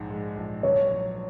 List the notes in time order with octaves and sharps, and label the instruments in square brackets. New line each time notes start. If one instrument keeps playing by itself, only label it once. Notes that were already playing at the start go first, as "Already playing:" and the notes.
Already playing: [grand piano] A#1 G#2
G#3
A#1
[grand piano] F#3 [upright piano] C#5
[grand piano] A#1